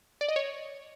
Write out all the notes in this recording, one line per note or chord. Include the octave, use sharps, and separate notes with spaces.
D5
D#5
C#5